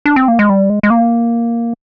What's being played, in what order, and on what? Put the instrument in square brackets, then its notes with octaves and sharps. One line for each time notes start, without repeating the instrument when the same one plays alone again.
[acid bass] D4
C4
A#3
G#3
G3
G#3
G#3
A#3